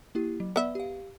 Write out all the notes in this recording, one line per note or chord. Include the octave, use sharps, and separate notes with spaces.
A#3 E4 G4
F#3
B3 D5 E5
G4 F5